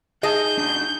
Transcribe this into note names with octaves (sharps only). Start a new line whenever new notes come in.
D#4 G#4 D#5 A5 G6
D4 D#4 F#4